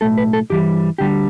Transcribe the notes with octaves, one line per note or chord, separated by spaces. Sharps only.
B1 A2 A3 A4
B4
A4
G2 E3 G3 G4
D2 D3 G3 G4